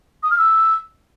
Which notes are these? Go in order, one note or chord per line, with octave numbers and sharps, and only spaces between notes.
D#6
F6
E6